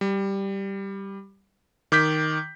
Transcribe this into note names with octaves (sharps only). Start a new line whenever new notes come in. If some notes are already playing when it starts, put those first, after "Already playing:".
G3
D#3 D6 G6 B6